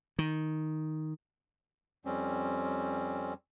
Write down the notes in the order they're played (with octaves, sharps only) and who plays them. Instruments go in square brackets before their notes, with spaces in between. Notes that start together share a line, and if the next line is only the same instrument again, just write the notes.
[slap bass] D#3
[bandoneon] F2 G3 C4 C#4